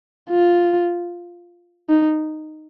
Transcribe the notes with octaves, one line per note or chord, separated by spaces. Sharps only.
F4
D#4